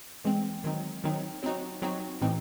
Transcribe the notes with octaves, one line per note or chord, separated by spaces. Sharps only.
E3 G#3 C4
D#3 F#3 C4 D#4
D#3 F#3 C4 D#4
F#3 C4 D#4 F#4
F#3 C4 D#4 F#4
A2 E3 C4 D#4